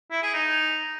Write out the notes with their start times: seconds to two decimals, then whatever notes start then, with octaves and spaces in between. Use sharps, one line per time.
0.11 E4
0.22 G#4
0.34 D#4